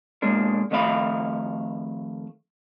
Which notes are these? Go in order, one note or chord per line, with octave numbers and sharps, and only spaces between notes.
B1 G#3 A#3 D4
F2 D#3 A3 E5 F5 B5